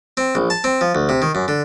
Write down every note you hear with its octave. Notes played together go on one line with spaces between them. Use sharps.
C4
A#1
A5
C4
F3
D2
C3
D#3
F#2
D3